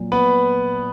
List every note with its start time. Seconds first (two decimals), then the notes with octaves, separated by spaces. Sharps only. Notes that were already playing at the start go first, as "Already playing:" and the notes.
Already playing: A#2 F#3
0.12 B3 B4